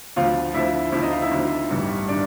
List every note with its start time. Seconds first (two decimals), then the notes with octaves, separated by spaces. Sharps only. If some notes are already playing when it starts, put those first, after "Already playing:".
0.16 D2 D3 F3 F4 F5
0.54 D2 D3 F3 E4 E5
0.92 D2 D3 F3 E4 E5
1.02 D#4 D#5
1.12 F4 F5
1.22 E4 E5
1.31 D2 D3 F3
1.70 A1 G2 D#3 G3
2.08 D#3 D4 D5